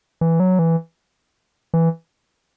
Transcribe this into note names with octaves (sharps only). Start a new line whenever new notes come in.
E3
F#3
E3
E3